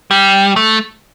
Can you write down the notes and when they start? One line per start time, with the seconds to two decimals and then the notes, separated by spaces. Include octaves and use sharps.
0.11 G3
0.56 A3